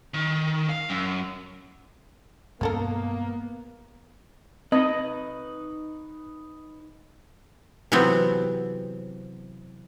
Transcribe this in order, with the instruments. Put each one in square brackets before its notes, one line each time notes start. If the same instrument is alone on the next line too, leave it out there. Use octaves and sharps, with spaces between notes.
[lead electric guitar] D#3
F5
F#2
[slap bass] G2 B2 G#3 [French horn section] A#3 [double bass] B3 [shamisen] C#4 A4 A#4
[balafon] C4 [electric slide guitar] D#4 B4 [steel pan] D#5
[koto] C3 E3 F#3 B3 C4